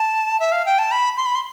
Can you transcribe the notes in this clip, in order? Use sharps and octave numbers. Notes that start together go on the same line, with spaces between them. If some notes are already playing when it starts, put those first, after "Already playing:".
Already playing: A5
E5
F5
G5
A5
B5
C6
B5
C6